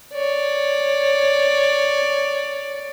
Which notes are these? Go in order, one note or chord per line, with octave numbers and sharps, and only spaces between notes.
C#5 D5